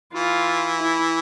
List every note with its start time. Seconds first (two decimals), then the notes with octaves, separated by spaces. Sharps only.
0.14 E3 F4
0.79 E4